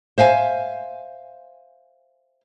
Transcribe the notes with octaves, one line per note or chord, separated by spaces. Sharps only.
C5 E5 F5 G#5